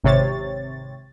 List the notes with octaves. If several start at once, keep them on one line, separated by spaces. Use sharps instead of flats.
G#1 C3 C#5 A6